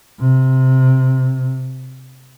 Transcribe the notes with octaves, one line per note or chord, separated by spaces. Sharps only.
C3